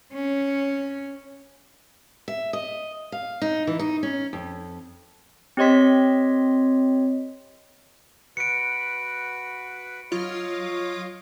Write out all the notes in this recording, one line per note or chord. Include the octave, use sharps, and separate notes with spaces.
C#4
E5
D#5
F5
D#4
E3
D#4
C#4
F2
C4 G4 C#5 D#5 C6 B6
F#4 B4 C#7 D7
F#3 F4 C#5 D#5